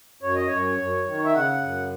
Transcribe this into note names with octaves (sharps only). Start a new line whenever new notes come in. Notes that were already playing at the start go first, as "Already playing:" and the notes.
F#2 C#5
D#5
F#2 C#5
F#2
D#3
E5
C#3 F#5
F#2